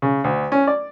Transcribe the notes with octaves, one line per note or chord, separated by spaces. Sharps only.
C#3
D2
C#4
D5